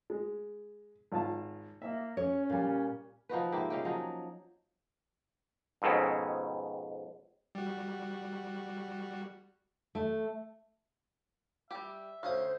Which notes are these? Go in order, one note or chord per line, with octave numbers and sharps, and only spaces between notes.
G#3
G#1 F4 A5
A#3 E5
C#4 C#5
A#2 G3
F3 D#4 F#4 B4
G#2 A#3 E4 G4
G#3 C#4 F4 G4
F3 F#3 D#4
F2 G#2 B2 C4 C#4
G3 F#4
A3
G3 G4 E5
D2 C#4 C5 F5 D#6